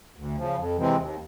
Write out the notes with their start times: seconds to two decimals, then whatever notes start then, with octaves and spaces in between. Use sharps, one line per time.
0.17 D2
0.37 C#3 F3
0.57 F2
0.76 C3 E3 G#3 C4
0.97 D#2